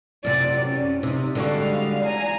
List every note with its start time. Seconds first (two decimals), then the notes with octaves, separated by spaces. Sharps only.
0.25 F#2 C3 D5
0.66 C#4
1.03 C3 D#4
1.35 D3 G3 G#3 F#4 F5
2.06 G#5 A#5